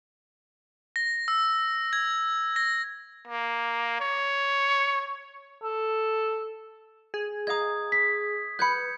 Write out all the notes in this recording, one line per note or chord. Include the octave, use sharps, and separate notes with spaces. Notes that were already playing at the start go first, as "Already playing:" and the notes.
A#6
E6
G#6
A#6
A#3
C#5
A4
G#4
D#5 F5 A#5 D#6 G#6
B6
B4 B5 G6 G#6 C#7